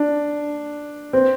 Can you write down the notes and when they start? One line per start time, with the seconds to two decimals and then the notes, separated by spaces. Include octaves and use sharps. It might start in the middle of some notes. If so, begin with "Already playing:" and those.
Already playing: D4
1.13 C4